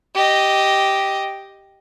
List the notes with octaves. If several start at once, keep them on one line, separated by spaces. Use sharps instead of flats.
G4 D#5